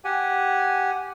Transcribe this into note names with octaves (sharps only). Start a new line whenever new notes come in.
G4 F#5 G#5